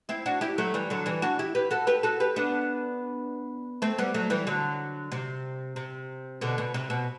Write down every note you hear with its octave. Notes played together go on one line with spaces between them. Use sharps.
C4 E4
D4 F#4
E4 G4
F#3 A3
E3 G3
D3 F#3
E3 G3
D4 F#4
E4 G4
G4 B4
F#4 A4
G4 B4
F#4 A4
G4 B4
B3 D4
A3 C4
G3 B3
F#3 A3
E3 G3
D3 F#3
C3
C3
B2 D3
B2
C3
B2